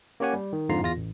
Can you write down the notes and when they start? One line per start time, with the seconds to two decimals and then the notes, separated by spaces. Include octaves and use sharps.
0.20 A#3 C#4 G4 C#5 F#5 G#5
0.33 G3
0.53 D#3
0.69 F2 G#2 D3 F4 A#5 C7
0.82 E2 F4 A#6
0.97 A1